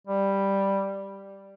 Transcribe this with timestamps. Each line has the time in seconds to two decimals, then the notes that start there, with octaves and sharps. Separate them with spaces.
0.07 G3